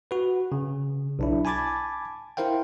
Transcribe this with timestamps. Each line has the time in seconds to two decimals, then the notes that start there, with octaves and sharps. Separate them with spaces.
0.11 F#4 B4
0.52 C#3
1.19 B1 D4 E4
1.45 G#5 A5 B5 D6 G#6 A6
2.37 E4 A#4 C5 F5 G5